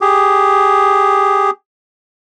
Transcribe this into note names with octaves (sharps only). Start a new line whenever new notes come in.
G4 G#4